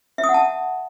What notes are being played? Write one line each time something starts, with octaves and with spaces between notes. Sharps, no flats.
E5
D#6
F#5
A5